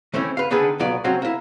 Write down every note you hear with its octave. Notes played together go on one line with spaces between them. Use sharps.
E3 A3 C4 C#4 E4
B4 F5
D3 D#3 D4 G#4 A4 B4
B1 F#3 B3 F4 D5
F#3 C4 C#4 F#4 F5
A#3 E4